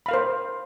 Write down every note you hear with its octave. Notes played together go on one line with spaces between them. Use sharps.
A#4 C5 F5 B5